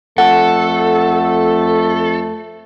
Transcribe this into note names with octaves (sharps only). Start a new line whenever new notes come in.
F2 A3 A4 F#5